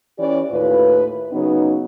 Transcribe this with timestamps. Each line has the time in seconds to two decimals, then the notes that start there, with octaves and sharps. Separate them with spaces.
0.19 E3 C#4 E4 G4 C#5 D5
0.50 D#2 A2 E4 F4 B4
1.32 C#3 F#3 B3 D#4